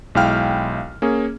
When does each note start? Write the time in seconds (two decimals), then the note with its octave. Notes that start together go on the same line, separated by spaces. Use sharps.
0.15 B1 G#3 E4 F5 G5 F6
1.02 A#3 C#4 G#4